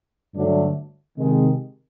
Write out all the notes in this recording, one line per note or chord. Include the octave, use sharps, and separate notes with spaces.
G2 D3 F#3 A3 D4
C3 D#3 G#3